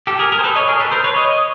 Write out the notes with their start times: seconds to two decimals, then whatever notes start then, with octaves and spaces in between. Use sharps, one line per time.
0.07 G4 A4
0.19 G#4 A#4
0.32 G#4 A#4
0.39 C5
0.44 A4 B4
0.55 C#5 D#5
0.68 G#4 A#4
0.80 A4 B4
0.92 A#4 C5
1.04 B4 C#5
1.16 C#5 D#5